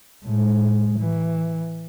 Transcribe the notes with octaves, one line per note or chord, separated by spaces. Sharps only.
A2 G#3
E3